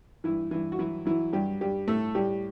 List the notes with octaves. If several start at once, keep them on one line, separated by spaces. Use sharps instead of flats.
G2 E3 E4
G2 E3 E4
F#4
E3 F#3 E4
E3 F#3 E4
G2 G3 G4
G2 G3 G4
A2 A3 A4
A2 G3 G4